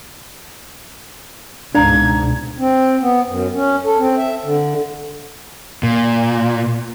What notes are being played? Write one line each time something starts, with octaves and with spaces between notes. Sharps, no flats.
C#2 G#2 B2 D4 D#4 F5 A#5 G#6
C4
B3
F#2
C#4
A4
C4
E5
D3
A#2